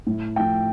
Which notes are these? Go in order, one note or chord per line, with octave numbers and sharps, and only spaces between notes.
A2
F3 A3 G5